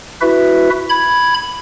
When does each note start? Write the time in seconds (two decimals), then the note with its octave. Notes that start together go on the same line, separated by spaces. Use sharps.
0.21 E4 F#4 B4 E5
0.90 B5 G#6